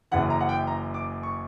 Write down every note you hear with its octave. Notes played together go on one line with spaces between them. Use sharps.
F#1 F#2 C#3 E3 F#5
A#5
F#5
G5
A#5
D6
C#6